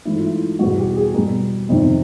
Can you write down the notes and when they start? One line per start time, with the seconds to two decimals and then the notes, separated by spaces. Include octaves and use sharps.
0.05 G#2 E3 A3 E4
0.16 F4
0.26 E4
0.59 E2 B2 G3 F#4
0.78 G4
0.96 G#4
1.14 B2 G3 A#4
1.69 F2 C3 D#3